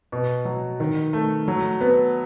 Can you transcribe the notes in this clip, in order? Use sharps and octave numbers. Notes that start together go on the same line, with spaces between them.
B2
F#3
D#3
A3
F#3
B3